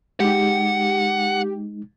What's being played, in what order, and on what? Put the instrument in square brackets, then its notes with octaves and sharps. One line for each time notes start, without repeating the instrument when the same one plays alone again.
[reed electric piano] G#3 D#4 [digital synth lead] G4 [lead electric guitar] F#5